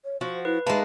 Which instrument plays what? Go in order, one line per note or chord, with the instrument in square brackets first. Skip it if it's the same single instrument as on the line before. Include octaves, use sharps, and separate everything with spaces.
[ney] C#5
[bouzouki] F3 F#4 [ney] C5
[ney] E4 [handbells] B4
[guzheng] G#3 A#3 [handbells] D#4 A5 [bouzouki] B4 [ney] E5